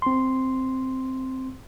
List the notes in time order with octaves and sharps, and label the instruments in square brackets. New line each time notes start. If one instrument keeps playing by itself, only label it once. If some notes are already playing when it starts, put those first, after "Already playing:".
[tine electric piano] C4 C6